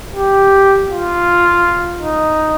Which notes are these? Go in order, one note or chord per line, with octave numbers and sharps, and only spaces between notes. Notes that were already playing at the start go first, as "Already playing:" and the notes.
G4
F4
D#4